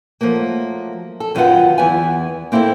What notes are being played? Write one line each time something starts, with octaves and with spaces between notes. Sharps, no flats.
F3 F#3 A3 A#3
A4
F#2 D#3 F#3 F4 B4 F#5
E2 E3 B3 G#5
A#3 C4 E4 A4 C5